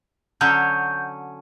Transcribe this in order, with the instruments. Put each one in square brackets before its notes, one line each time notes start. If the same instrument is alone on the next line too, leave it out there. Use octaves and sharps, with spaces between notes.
[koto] D3 F#3 C#4 [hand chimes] G6